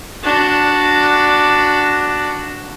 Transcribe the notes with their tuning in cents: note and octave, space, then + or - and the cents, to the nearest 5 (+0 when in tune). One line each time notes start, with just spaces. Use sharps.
D4 +0 F#4 +0